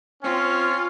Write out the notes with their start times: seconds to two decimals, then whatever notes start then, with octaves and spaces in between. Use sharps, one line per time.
0.23 C4 C#4 F4